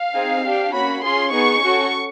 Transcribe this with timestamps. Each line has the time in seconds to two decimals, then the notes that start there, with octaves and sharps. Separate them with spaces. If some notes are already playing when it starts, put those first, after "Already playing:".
Already playing: F5
0.14 C4 D#4 G#4
0.43 D4 G4
0.73 A#3 C#4 F#4 B5
1.02 C#4 F4 G#4 C6
1.32 B3 D#4 G#4 C#6
1.61 C#4 F#4 A4